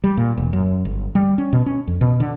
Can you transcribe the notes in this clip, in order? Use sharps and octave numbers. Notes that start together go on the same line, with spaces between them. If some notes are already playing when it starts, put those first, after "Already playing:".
G3
A#2
E1
F#2
G1
G3
C#4
B2
C#4
F2
B2
D3